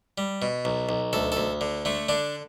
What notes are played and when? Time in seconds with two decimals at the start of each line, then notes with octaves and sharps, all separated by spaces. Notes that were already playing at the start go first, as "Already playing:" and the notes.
0.18 G3
0.42 B2
0.65 B1
0.89 B1
1.13 D2 A4
1.32 A4
1.37 D2
1.61 D3
1.85 D3 A3
2.09 D3 D4